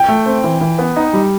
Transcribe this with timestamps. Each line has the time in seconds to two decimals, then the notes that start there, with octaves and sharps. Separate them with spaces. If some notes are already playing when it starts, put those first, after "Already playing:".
Already playing: G5
0.08 A3
0.26 C4
0.44 E3
0.61 E3
0.79 B3
0.96 D#4
1.13 G3